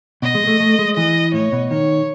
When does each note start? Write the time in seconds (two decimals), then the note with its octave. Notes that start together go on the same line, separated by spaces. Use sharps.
0.22 B2 D#5
0.35 G#3
0.47 A3
0.60 A3
0.79 G#3
0.96 E3 D#5
1.33 A2 C#5
1.52 B2
1.70 D#3 C#5